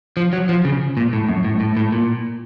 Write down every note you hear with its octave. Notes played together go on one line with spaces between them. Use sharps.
F3
F#3
F3
C#3
A#2
A2
F#2
A2
A2
A2
A#2